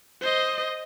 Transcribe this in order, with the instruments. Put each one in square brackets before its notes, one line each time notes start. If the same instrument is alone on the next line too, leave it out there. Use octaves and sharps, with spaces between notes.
[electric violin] C5 D#5